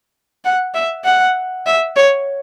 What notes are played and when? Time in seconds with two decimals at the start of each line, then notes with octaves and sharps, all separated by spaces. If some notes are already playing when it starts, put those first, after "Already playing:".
0.45 F#5
0.75 E5
1.05 F#5
1.66 E5
1.96 C#5